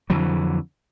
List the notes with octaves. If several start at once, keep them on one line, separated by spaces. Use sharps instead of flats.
F2 D3 E3 F#3